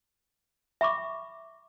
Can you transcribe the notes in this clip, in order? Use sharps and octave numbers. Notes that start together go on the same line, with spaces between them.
E5 B5 C#6 D6